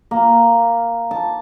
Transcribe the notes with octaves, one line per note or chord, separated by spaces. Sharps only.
A#3
A5